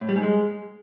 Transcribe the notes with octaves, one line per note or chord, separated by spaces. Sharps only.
A2
G3
G#2
G#3